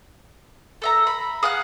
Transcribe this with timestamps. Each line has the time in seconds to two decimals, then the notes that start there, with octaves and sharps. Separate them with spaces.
0.82 A4 E5 A#5
1.07 B5
1.43 G#4 F5 F#5 F#6